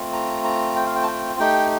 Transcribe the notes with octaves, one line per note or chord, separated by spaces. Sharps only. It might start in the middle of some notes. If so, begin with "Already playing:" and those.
Already playing: A3 C4 F4
A#5
A#5
G5
F5
G5
A5
G5
A3 D#4 G4 G5